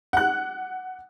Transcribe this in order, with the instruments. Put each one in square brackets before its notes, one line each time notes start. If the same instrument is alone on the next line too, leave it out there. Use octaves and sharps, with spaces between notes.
[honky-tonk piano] F#5 F#6